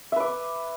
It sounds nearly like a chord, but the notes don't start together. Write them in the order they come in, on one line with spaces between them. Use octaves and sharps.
E5 B4 D6